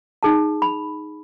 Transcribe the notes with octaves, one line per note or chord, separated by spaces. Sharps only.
D#4 G#4 A5
B5